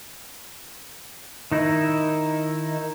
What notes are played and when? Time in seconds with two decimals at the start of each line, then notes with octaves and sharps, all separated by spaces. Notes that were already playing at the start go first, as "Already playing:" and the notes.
1.52 D#3 D#4 E4